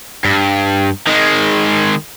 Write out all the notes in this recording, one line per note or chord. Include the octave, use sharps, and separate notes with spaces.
G2
D#3 G#3